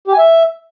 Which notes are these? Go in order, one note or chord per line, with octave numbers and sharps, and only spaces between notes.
G4
G#5
E5